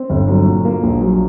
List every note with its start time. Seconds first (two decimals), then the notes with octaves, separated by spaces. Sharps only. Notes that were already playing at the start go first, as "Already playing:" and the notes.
Already playing: C4
0.10 G1
0.28 F#3
0.46 A#2
0.65 A#3
0.83 A#1
1.01 F#3